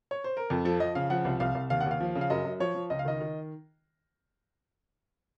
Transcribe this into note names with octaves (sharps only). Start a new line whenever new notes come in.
C#5
C5
A#4
F2 A4
F3 A4
F3 D#5
C#3 F5
F3 F#5
C2
C2 F5
C2
D#2 F5
F#5
D#2
F5
F3
C#3
F5
F#2 D#5
F#2
F3 C#5
F3
C#2 D#5
F5
D#3 D#5
D#3